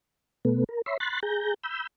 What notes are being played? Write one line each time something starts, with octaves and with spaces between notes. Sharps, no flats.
B2 A3 B3
A#4
C#5 E5 B5 C6
B5 C6 F#6 A6
G#4 A#5 G6
B5 E6 G6